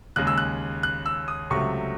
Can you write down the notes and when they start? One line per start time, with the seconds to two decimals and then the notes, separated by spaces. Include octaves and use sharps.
0.16 D#2 C#3 G#3 F#6
0.27 E6
0.38 F#6
0.83 F#6
1.06 E6
1.28 D#6
1.50 C#2 C3 F#3 A3 C#6